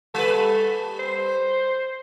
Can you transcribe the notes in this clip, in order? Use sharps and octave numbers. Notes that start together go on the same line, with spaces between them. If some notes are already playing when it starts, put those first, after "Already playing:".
G3 A4 B4
C5